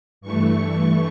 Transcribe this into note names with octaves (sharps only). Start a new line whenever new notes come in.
G2 E3 A3 C#6